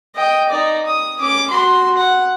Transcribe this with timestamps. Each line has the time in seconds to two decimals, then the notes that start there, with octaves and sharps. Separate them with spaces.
0.15 D#5 G5
0.49 D#4 D5
0.86 D#6
1.19 C#4 D6
1.49 F#4 C6
1.97 F#5